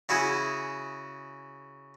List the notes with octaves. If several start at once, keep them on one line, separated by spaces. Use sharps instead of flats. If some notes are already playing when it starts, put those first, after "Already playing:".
C#3 E4 F#4 G#4